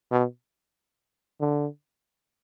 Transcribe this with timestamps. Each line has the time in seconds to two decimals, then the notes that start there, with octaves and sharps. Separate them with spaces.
0.12 B2
1.41 D3